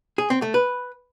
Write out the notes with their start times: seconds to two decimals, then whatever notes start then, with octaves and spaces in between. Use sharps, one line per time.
0.18 G#4
0.30 C4
0.42 A3
0.54 B4